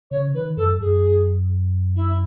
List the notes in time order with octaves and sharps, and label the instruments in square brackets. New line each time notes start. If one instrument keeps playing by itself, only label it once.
[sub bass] C#3 [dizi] C#5
[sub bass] D#3 [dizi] B4
[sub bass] F#2 [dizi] A4
[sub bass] F#2 [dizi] G#4
[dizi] E4